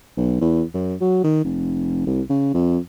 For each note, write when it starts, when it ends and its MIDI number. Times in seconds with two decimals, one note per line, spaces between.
0.17 0.39 35
0.41 0.63 40
0.74 0.95 42
1.01 1.19 54
1.24 1.44 51
1.44 2.04 29
2.07 2.21 36
2.30 2.50 49
2.54 2.78 41